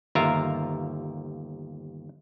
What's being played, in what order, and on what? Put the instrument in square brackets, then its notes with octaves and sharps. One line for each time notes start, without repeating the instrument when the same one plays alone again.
[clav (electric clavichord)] G1 D#2 F4 A#4 E5 A#5